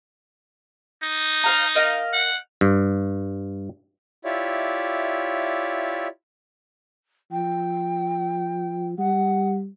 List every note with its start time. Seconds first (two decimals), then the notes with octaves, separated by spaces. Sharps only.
1.03 D#4
1.44 C5 F5 A#5
1.75 A#4 D#5 F5
2.13 F#5
2.61 G2
4.25 E4 F4 G4 C#5 D5 E5
7.32 F3 G5
8.98 G3 F#5